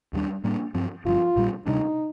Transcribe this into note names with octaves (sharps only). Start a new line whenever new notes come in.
D#2 D3 G3 D4
A2 G3 A#3 D4
G2 F3 C4
G1 G2 F3 F4
A#1 A#2 G3
D2 C3 G3 D4 D#4